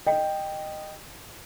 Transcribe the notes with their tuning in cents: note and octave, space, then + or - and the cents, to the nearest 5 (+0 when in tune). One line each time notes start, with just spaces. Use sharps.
D#5 -15 G5 +0